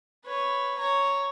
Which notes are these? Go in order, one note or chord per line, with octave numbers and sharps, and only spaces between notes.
B4 C#5
C#5 A#5